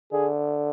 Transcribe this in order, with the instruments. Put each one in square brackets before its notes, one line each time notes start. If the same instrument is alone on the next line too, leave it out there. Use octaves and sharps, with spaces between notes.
[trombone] D3 [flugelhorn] G#4